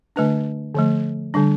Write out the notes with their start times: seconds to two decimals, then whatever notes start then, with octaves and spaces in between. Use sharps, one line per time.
0.16 D3 A3 D4 B4
0.75 D3 F3 A3
1.34 D3 G3 D4